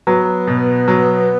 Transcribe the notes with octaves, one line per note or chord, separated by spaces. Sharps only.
F#3 B3
B2
F#3